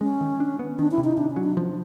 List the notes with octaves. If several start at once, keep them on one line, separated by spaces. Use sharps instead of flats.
G#3 C#4
D#3
D4
B3
D#3 D4
E4
C3
D#4
C3 D4
C#4
F#3
D4
F3